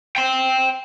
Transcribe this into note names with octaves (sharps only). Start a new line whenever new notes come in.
G5 C6